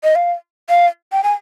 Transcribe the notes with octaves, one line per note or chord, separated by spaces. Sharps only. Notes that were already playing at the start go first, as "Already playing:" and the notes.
D#5
F5
F5
G5
G#5